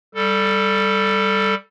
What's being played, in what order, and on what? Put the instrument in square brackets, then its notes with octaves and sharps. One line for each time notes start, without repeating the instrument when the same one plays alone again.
[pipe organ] G3 A4